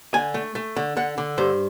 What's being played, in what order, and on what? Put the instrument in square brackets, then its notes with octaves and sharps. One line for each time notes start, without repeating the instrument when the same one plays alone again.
[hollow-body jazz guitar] D3 G#5
A3
A3
D3
D3 F#5
D3
G2 C5